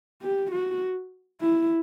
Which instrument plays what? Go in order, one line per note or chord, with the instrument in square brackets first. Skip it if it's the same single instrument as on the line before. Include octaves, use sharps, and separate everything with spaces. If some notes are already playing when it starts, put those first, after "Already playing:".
[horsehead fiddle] G4
F#4
E4